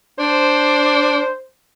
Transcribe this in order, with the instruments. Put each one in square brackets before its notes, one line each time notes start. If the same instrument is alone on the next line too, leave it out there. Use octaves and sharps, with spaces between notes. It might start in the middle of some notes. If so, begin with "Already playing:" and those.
[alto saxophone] D4 [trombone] C5